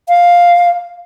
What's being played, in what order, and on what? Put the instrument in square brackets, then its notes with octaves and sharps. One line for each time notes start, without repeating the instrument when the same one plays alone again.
[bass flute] F5